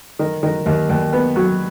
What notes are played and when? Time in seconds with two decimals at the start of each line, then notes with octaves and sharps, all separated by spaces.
0.19 D#3
0.43 D#3
0.66 D#2
0.90 D#2
1.13 B3
1.36 F#3